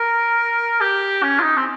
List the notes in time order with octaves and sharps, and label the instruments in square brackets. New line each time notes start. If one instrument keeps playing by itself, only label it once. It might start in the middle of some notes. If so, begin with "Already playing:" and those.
Already playing: [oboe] A#4
G4
C#4
F4
D#4
C4